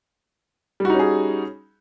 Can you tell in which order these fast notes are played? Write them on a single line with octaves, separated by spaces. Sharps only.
G3 F#4 D#4 C#4 G#4